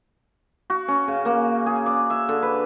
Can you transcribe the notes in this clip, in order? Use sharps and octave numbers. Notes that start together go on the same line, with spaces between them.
F#4
C#4
C#3
A#3
G#4
D5
E5
D3
B4